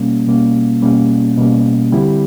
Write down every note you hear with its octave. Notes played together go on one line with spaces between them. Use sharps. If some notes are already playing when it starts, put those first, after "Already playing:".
Already playing: B2 G3 A#3 C#4
B2 G3 A#3 C#4
B2 G3 A#3 C#4
B2 G3 A#3 C#4
D3 G3 C4 E4 G4